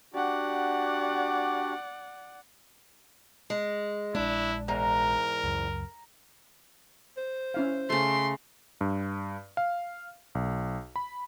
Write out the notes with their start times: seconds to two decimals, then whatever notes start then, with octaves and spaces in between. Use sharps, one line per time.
0.14 D4 F#4 G4 D5 F#5
3.50 G#3
4.15 A#1 G#3 D4 E4
4.68 E2 G#2 A#4 A#5
5.44 C#2 F#2
7.17 C5
7.54 C#4 E4 F5
7.90 C#3 A3 C6
8.81 G2
9.57 F5
10.35 B1
10.96 B5